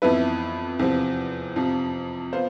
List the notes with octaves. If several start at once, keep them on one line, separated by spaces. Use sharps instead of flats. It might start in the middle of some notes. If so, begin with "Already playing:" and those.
F2 E3 B3 E4 B4
E2 C3 F3 C4
F2 C3 F3
B3 F4 C5